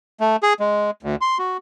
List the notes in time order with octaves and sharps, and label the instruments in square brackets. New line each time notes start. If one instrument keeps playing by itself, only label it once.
[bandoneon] A3
G#4
G#3
D2
C6
F#4